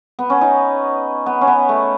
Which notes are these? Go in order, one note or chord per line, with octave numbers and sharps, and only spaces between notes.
B3
C#4
D#4
B3
C#4
B3
A3